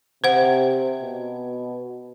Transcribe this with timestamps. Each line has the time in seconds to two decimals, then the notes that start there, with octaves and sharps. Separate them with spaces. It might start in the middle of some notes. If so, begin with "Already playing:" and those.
0.24 C3 C5 F#5
1.02 B2